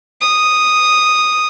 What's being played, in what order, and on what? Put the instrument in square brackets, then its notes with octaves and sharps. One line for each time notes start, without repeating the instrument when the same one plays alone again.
[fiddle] D#6